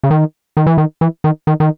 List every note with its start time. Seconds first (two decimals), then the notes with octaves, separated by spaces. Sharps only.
0.03 C#3
0.11 D#3
0.57 D#3
0.66 E3
0.78 D#3
1.01 E3
1.24 D#3
1.47 D#3
1.60 D#3